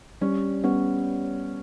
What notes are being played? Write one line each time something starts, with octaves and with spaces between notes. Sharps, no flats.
G3 C#4
G3 B3 C#4